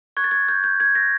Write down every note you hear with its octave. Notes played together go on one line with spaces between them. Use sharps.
C#6 F#6 G#6
A6
G#6
G6
G6
G#6
A#6